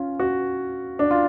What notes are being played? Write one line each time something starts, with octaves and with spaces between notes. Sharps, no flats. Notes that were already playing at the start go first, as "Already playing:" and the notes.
Already playing: C#4 F4
F#4
D4
F4